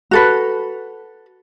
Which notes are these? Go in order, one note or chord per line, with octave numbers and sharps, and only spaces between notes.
F#4 A4 B4